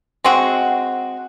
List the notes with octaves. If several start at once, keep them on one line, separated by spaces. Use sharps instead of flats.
G#3 C4 F#4